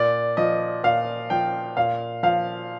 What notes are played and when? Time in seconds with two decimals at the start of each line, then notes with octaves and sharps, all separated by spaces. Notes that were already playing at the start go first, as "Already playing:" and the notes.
Already playing: A#2 D5
0.37 F3 D#5
0.84 A#2 F5
1.30 F3 G5
1.77 A#2 F5
2.23 F3 F5